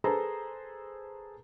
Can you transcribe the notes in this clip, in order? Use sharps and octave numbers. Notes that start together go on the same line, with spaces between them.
G#4 A4 B4 C5 A#5